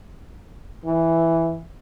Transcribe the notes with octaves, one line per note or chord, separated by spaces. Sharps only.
E3